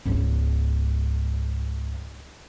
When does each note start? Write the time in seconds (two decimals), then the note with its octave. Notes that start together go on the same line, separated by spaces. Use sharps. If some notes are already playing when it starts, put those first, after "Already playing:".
0.05 C#2 G#2